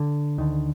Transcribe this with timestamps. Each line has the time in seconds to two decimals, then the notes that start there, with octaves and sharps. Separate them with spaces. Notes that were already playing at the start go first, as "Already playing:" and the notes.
Already playing: D3
0.38 D2 D3 D#3